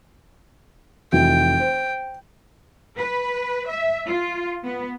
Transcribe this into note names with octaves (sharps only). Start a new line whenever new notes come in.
F1 E3 F#4 G5
C5
B4
E5
F4
B3